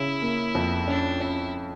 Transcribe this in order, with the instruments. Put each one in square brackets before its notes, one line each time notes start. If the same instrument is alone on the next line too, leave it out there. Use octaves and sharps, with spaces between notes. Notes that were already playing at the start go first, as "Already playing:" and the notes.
Already playing: [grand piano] C#3 [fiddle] E4
[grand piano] A#3
F2
[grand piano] C#4 [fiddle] D4
[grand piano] C#4 [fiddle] E4